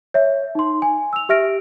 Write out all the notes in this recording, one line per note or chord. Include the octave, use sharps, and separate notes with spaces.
C#5 E5
D#4 C6
G#5
E6 F7
G4 E5 F6 A#6 D7